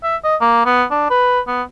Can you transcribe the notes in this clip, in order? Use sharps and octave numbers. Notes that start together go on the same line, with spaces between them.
E5
D#5
A#3
B3
D4
B4
B3